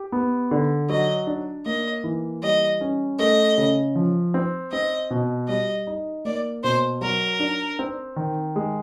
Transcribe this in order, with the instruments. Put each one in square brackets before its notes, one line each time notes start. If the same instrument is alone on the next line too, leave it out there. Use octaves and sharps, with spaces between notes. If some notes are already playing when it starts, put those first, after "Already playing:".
Already playing: [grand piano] G4
B3
D3
[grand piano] F#3 [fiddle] D#5
[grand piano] D4
[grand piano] A#3 [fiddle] D#5
[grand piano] E3
[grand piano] G3 [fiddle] D#5
[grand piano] C#4
[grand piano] A3 [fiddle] D#5
[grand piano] C#3
F3
C4
[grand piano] C4 [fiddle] D#5
[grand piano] B2
[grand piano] G3 [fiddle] D#5
[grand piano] D#4
[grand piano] A#3 [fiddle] D5
[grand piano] B2 [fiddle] C5
[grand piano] F#3 [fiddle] A#4
[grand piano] D4
C4
D#3
G#3